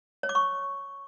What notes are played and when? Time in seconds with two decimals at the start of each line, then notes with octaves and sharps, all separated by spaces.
0.23 C#5
0.29 D6
0.35 C#6